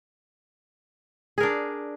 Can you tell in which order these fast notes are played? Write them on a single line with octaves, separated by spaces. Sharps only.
G#4 A#4 D4